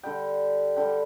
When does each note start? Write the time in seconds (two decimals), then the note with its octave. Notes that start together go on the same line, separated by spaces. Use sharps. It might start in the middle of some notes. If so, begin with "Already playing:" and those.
0.03 D3 G3 G5
0.76 D3 G3 G5